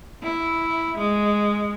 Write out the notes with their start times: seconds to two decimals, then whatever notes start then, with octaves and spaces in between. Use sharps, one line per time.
0.23 E4
0.98 G#3